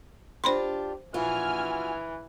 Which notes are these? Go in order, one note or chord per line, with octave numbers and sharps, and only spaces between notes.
D4 F4 G4 C5 B5 C6
A#1 E3 F4 F#4 G#5 F6